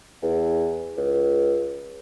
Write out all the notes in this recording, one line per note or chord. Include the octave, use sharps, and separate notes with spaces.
E2
C#2